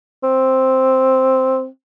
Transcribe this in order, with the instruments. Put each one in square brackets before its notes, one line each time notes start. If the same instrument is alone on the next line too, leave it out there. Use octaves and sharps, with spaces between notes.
[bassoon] C4